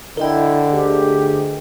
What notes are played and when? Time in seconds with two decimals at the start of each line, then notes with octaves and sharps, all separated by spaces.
0.17 D3 E4 A#4 D#5 G5
0.71 D2 G4 G#4